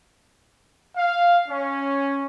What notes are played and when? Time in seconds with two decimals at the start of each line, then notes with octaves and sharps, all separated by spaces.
0.96 F5
1.49 C#4